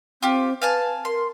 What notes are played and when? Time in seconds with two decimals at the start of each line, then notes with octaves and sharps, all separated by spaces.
0.23 C4 F4 G4
0.62 B4 F5 G#5 A5
1.05 A#4 C6